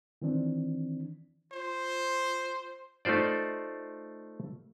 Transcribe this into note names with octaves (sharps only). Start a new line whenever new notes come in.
D#3 E3 C4 D4
F4 C5
A3 D#4 F4 C5 D5